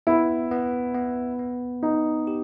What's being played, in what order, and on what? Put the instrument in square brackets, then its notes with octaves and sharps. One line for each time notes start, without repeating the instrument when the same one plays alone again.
[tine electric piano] B3 [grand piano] E4
[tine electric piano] B3
B3
B3
[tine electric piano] B3 [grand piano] D#4
[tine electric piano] G4